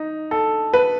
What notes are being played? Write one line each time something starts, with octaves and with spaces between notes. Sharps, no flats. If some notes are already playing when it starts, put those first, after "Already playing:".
Already playing: D#4
A4
B4